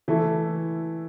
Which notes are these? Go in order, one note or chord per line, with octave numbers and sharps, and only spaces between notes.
E3 A3 E4 A4